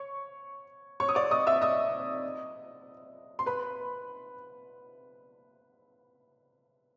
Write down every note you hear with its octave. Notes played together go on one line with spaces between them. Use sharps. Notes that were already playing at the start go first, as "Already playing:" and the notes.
Already playing: C#5 C#6
C#5 C#6
D#6
D5 D6
D#5 D#6
E5 E6
D#5 D#6
C6
B4 B5